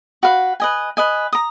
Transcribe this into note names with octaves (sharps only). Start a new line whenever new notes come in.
F#4 B4 F5
B4 D#5 G#5
B4 D#5 G#5
A#5 D#6